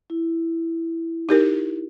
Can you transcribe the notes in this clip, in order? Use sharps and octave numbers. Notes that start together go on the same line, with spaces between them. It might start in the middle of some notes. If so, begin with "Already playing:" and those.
E4
D#4 G4 A#4